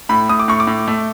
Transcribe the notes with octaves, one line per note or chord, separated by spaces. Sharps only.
A2 B5
A2 D#6
D6
A2 C#6
D6
A2
A3